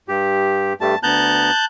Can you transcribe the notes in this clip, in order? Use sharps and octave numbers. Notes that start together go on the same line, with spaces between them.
G2 G4
G2 G3 A3 A5
D2 B3 A5 A#5 F#6 G6